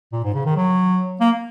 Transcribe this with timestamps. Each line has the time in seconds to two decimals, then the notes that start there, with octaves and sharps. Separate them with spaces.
0.12 A#2
0.24 G#2
0.34 C#3
0.45 D#3
0.56 F#3
1.20 A#3